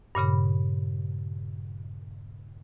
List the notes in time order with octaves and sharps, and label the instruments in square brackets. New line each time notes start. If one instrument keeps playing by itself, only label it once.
[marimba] G2 A#2 C#3 B5